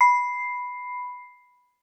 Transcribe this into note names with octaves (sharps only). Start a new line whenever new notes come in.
B5 C7